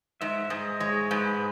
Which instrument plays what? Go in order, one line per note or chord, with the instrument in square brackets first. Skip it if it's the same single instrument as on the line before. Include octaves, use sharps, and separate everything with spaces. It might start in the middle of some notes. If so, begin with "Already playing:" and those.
[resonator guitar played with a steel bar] G#2 [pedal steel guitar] E5
[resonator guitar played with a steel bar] G#2 [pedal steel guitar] D#5
[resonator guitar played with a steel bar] G#3 [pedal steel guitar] C#5
[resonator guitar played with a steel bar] G#2 [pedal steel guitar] B4